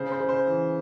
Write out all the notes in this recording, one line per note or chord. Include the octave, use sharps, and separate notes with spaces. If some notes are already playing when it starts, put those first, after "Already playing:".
Already playing: C#3 C5
C5
C#3
C5
E3